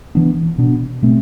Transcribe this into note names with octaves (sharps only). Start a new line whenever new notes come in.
E3 B3 D4
B2 B3 D4
B2 A3 C4